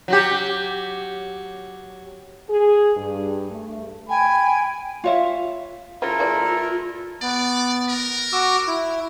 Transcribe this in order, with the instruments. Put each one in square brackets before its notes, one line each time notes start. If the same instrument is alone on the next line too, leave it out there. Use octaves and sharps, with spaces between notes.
[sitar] F#3 F#4 G4
[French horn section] G#4
G2
A3
[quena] G5 [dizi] G#5 [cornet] B5
[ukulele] F4 C#5 E5
[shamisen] C#3 F3 [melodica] E4 A4 A#4 [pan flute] F4
[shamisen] E3 G#3 D5
[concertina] B3 [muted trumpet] D5
[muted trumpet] A#4
[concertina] F#4 D6 E6
E4